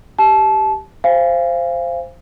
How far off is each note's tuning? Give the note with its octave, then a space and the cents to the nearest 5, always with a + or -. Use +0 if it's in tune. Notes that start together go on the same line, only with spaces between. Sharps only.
G4 +0 A5 -25
C5 +0 F5 -25 G#5 -25